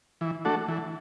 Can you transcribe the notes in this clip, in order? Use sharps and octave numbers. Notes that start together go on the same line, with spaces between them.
E3
A3 D4 F#4 A4
E3